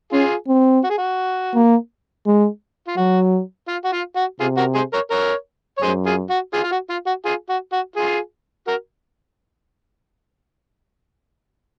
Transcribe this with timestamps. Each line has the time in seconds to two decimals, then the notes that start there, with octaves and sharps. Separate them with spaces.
0.12 C#4 F4 G#4
0.48 C4
0.84 F#4
0.90 G#4
0.98 F#4
1.55 A#3
2.26 G#3
2.88 F4
2.97 F#3 F#4
3.68 F4
3.85 F#4
3.93 F4
4.16 F#4
4.40 C3 F4 G#4
4.57 F#4 A#4
4.75 G#4 C5
4.93 A#4 C#5
5.11 A#4 C#5
5.78 C#5
5.82 F#2 G#4 C5
6.06 F4 G#4
6.30 F#4
6.54 F4 G#4
6.64 F4
6.72 F#4
6.90 F4
7.07 F#4
7.25 F4 G#4
7.49 F#4
7.73 F#4
7.96 F4 G#4
8.67 F#4 A#4